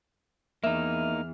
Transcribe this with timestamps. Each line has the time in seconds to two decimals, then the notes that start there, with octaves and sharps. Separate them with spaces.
0.64 E2 A#3 D#4 E5 F6